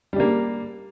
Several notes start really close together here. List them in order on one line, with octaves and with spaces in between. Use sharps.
G3 D4 A#3